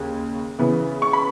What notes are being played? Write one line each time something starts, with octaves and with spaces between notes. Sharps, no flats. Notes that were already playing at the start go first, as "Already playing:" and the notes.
Already playing: D#2 C#3
C#3 E3 B3
C#6
B5